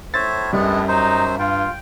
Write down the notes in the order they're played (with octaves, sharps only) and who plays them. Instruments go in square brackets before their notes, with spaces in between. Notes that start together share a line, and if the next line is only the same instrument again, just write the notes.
[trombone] A2 [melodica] C5 C#5 E5 [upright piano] A6
[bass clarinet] F#2 [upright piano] G3 [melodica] G#3 B3 D4
[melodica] F#3 C5 [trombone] D#4
[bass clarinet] G2 [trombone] F4 [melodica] G5